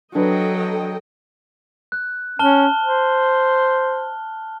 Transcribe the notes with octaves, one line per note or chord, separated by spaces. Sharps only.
F#3 D4 A4 B4 D#5 G5
F#6
C#4 A5 F6 G7
C5